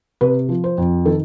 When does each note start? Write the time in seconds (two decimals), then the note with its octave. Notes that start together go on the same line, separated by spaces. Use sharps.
0.21 C3 B4
0.49 F3
0.64 C5
0.78 F2
1.05 D#3 A4